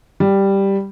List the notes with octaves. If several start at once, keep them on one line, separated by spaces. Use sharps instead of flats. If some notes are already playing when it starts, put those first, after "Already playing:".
G3